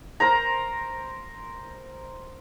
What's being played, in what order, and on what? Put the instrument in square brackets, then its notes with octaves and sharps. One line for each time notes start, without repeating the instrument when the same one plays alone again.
[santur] A#4 C5 A#5